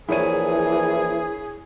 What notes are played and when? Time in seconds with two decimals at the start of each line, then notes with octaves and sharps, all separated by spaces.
0.09 A#1 E3 E4 G#4 C#5 D#7